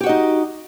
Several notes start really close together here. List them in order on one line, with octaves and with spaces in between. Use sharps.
G4 F#4 D#5 D#4